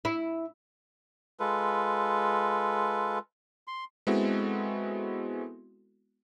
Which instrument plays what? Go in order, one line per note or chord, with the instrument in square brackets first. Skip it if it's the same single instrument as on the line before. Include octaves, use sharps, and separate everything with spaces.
[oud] E4
[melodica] G#3 F4 A4 B4
C6
[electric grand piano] G#3 B3 C4 E4 F#4 A4